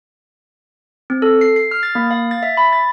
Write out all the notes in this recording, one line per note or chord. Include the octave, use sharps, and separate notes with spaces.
C4
A4
C7
C7
F6
A6
A#3
F5
A6
E5
B5
A6